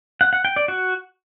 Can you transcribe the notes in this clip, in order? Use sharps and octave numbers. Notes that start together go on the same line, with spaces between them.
F#5
F#5
G5
D5
F#4